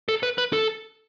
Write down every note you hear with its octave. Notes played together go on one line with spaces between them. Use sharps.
A4
B4
B4
A4